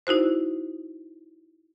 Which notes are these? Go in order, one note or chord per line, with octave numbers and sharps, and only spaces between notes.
D#4 E4 F#4 C5